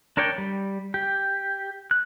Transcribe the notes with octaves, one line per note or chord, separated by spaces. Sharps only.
D4 A#4 C#5 D5 G5
G3
G4
F#6